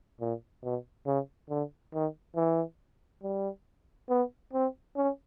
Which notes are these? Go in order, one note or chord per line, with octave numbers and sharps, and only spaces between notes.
A#2
B2
C#3
D3
D#3
E3
G3
B3
C4
C#4